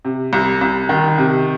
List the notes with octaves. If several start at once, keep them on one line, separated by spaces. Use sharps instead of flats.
C3
C2
C2
D#3
C3